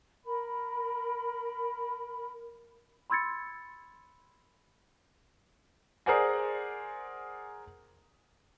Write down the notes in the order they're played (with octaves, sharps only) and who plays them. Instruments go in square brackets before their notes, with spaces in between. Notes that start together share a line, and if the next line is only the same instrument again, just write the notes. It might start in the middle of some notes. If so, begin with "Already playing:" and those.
[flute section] A#4 B5
[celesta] B5 C6 E6 G#6 A6 C#7
[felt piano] G#4 A#4 C5 D5 F#5 G#5